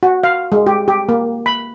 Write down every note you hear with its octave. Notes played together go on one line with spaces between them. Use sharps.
F#4
F5
G#3
G4
G4
A#3
B5